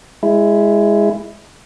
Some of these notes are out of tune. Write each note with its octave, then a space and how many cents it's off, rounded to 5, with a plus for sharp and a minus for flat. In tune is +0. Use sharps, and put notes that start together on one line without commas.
G#3 -10 E4 +10